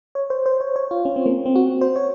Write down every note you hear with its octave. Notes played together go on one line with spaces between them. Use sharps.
C#5
C5
C5
C#5
C#5
F4
C#4
C4
A#3
C4
F#4
C5
C#5